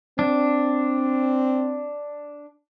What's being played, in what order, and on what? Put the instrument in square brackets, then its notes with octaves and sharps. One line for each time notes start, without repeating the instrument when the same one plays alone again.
[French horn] C4 [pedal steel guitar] D4